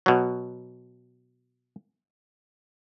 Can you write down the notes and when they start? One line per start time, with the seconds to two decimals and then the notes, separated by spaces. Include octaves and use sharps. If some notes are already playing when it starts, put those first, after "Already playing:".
0.06 B2 F#3